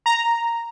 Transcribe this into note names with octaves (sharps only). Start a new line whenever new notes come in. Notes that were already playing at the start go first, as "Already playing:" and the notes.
A#5